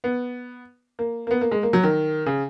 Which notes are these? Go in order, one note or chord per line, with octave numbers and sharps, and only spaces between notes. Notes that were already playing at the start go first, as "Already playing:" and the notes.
B3
A#3
A#3
B3
A#3
G#3
A#3
F#3
D#3
C#3